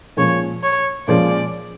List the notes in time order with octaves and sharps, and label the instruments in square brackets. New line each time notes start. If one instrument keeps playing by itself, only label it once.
[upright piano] A#2 F3 G#3 C#4 [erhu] C#5
[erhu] C#5
[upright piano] A#2 F3 G#3 C#4 [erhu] D5